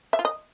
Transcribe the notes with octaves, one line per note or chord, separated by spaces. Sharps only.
E5
F4
D#5